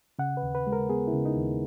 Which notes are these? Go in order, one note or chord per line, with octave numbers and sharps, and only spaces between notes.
C#3 F#5
B4
D#2
B4
G#3
A#4
B3 G#4
E4
C#3
D#4
D#2